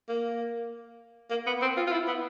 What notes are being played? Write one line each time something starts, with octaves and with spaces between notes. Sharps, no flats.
A#3
A#3
B3
C4
F4
F4
E4
B3